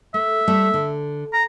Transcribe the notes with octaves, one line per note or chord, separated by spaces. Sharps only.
A3 E5
G3 A3
D3
A#5